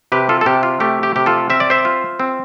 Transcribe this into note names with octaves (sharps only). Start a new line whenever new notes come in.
C3 G4 B4
F4 A4
A4
C3 G4
F4
A3 G4
G4
C3 G4
F4 A4
C4 E5
D5
C5 E5
F4
C4